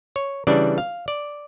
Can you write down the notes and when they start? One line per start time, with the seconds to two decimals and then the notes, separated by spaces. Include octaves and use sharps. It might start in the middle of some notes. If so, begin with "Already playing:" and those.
0.16 C#5
0.47 C#3 E3 G3 D4 D5
0.78 F5
1.08 D5